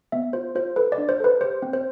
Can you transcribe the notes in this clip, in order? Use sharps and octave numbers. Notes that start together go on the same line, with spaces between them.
B3 E5
F4 C5
F4 C5
A4 B4
D5
D4
C5
A4 B4
G4 C5
C4
C5